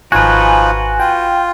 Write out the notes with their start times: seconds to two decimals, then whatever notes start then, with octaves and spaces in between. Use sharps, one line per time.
0.12 G#1 F3 D#4 F4 F#4 B4 G#5
1.00 F4 G5